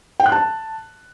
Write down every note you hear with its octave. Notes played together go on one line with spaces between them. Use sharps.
G5
F#6
A5